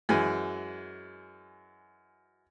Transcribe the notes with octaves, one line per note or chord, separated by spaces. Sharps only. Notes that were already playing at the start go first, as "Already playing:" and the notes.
F#2 E3 G#3 G#5